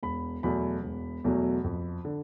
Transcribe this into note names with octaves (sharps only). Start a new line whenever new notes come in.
E1 B5
E2 B2 F#3 A3 B5
E1
E2 B2 F#3 A3
F2
D3